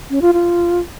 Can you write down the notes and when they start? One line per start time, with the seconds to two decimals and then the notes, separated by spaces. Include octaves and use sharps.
0.10 C#4
0.22 F4
0.33 F4